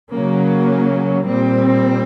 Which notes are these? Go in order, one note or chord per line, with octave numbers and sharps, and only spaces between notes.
C#3 F#3 A#3 C#4
A#2 G3 C4